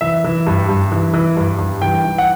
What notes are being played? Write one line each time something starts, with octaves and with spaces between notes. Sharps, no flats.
E3 E5
E3
G2
G2
E3
E3
G2
G2
E3 G5
E3
F#5